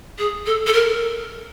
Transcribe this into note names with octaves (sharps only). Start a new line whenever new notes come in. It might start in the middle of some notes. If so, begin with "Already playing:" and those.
G#4
A4
A4
A#4